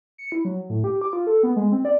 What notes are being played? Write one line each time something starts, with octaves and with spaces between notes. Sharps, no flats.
C#7
E4
F#3
A2
G4
D6
F4
A4
B3
G#3
C4
D5